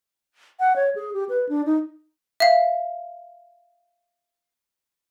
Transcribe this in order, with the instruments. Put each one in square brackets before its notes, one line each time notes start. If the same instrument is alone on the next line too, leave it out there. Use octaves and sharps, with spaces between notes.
[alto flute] F#5
C#5
G#4
G4
B4
D4
D#4
[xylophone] E5 F5